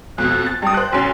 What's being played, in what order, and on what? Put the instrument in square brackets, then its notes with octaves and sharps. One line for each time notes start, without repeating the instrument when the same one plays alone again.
[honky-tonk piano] F2 B2 [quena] F#6
[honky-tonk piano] A6
[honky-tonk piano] G2 D#6 [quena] G5
[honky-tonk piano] C5 F#6
[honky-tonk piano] B1 C#4 [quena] C6